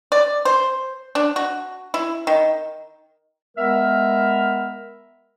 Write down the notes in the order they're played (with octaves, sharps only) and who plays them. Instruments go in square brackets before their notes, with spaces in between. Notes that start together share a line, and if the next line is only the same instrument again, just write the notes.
[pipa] D5
C5
D4
F#4
E4
D#3
[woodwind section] G#3 B3 A#4 E5 F6